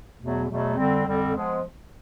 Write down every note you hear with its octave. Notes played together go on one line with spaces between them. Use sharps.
E2 B2 F#3 A3
E2 B2 F#3 A3
F2 D3 G3 C4
F2 D3 G3 C4
F3 G#3 B3